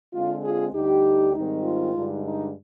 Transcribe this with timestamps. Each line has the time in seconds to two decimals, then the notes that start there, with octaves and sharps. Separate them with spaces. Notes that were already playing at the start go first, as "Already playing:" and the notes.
0.14 D3 G#3 C4 F4
0.44 F4 G#4
0.74 D2 D3 G3 D#4 G4
1.34 G#2 D#3 G3 C4 D#4
1.64 F4
1.94 G2 D3 G#3 D#4
2.25 D#4